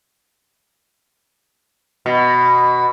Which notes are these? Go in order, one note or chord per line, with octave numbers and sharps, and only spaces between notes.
B2